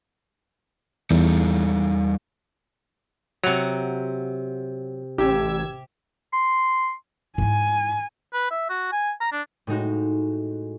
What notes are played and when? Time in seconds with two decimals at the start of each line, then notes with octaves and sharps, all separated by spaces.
1.11 E2 G3 D#4 A4
3.44 C3 F#3 F#5 A#5
5.18 A1 G4 E6 G#6
6.33 C6
7.38 G#2 E4 G#5
8.34 B4
8.51 E5
8.69 F#4
8.92 G#5
9.21 A#5
9.32 D4
9.67 A2 G#3 D#4 F#4